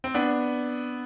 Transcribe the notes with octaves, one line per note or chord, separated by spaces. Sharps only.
C4
B3 D4